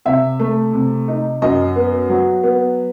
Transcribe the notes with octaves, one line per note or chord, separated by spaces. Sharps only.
C3 E5
A3
C3
D#4
F#2 D#5
B3
F#3
B3